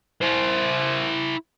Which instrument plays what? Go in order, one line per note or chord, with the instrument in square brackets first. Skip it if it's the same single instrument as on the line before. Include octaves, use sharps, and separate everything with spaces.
[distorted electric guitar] E4 C5